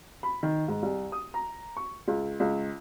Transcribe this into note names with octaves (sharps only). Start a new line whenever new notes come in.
B5
D#3
G#2
C2
D#6
A#5
C#6
C#2
C#2